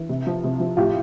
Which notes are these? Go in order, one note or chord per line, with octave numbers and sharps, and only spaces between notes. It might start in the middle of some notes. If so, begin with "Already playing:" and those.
Already playing: E3
C3
F3
C3
F3
A2 F4 G4